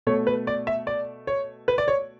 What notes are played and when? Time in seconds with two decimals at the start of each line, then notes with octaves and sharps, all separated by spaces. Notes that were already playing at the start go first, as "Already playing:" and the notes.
0.07 B2 A3 C#5
0.27 B4
0.47 D5
0.67 E5
0.87 D5
1.27 C#5
1.68 B4
1.78 D5
1.88 C#5